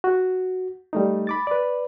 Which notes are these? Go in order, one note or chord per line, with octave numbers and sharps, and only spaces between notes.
F#4
G3 A3 D#4
B5 D6 A6
B4 D5